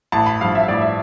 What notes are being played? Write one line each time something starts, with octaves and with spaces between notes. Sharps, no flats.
A1 A5
B5
G2 F3 F5
E5
A1 D5
E5